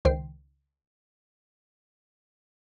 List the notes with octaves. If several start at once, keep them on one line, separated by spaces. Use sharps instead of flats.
C#2 D#3 C5 G5 C7